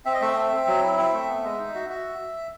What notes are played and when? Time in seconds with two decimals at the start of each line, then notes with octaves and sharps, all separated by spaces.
0.06 C4 E5
0.14 D#5
0.21 A3 E5
0.37 C4
0.52 C4
0.67 F#3
0.83 E4
0.98 C4
1.13 A3
1.29 B3
1.44 G#3
1.59 D#4
1.75 F#4
1.90 F#4 E5